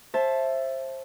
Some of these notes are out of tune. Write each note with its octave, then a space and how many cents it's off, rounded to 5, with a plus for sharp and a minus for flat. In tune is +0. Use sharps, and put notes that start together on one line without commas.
C5 +25 E5 +15 A5 -10